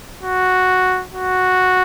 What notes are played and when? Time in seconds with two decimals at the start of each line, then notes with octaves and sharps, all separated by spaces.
0.22 F#4
1.13 F#4